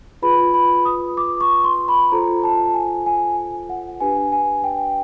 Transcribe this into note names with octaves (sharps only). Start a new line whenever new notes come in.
F4 G#4 B4 B5
B5
D#6
D6
C#6
C6
B5
F4 A4 C5 A#5
A5
G#5
G#5
F#5
D4 G4 B4 G#5
G#5
G5